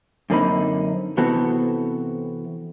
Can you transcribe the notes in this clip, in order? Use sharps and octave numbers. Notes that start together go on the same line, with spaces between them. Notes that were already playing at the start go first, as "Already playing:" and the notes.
F#2 D3 A#3 C4 D#4 B5
C3 E3 B3 C4 F#4 A4